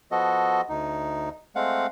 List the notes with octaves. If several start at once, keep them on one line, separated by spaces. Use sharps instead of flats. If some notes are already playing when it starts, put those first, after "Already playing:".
F3 B3 F#4 A4 D#5
D2 D#4
G#3 A3 C4 F5 F#5